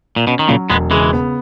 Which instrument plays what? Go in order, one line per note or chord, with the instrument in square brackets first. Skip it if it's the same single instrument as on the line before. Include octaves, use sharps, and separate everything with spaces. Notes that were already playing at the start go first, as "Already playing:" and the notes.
[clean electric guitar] A#2
[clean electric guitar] B2 [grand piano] C#4
[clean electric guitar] D#3
[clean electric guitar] A#2 C#3 [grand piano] F#3
[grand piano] E1 [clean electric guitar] G#3 B3
[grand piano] C#3 [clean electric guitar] E3 G#3
[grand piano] B3